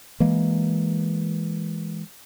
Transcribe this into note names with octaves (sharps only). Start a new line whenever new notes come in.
E3 G#3 A#3